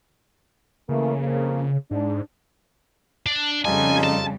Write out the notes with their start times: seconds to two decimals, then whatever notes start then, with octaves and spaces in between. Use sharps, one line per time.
0.89 C#3 E3 A3 A#3
1.20 F2 A#3
1.91 G#2 D4
3.26 D4
3.65 F2 C#3 G3 D#4 F4 A4 G#5
4.04 A5